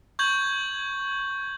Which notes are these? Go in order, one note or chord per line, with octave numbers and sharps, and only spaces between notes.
C#6 G6 G#6 F#7